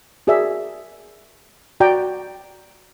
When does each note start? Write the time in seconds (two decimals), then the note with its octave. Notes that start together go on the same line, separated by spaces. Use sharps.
0.27 F#4 G#4 A#4 D5 E5
1.80 F#4 D5 G5 A#5